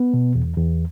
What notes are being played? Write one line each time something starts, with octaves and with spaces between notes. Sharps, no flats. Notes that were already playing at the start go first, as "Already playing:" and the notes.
Already playing: B3
B2
E2
E2